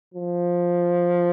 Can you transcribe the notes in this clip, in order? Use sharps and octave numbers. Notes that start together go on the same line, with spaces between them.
F3